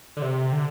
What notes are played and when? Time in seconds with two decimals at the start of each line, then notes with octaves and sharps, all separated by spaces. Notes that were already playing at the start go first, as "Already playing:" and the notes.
0.17 D3
0.22 C3
0.52 D3